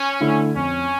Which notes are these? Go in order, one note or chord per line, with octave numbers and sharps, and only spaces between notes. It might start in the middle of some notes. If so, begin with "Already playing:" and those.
Already playing: C#4
D3 A3 E4
F2 C#4